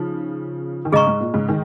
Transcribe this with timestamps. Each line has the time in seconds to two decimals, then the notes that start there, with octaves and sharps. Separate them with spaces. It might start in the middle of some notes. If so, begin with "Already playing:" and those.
Already playing: C#3 F3 D#4
0.85 D#3
0.92 G#2 C#3 G#4 D#5 A#5 C#6
1.07 G#2
1.20 A#2
1.34 G#2 C#3
1.49 D#3 G#3